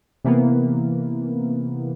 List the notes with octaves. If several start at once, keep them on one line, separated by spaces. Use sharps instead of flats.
C3 E3 A#3 B3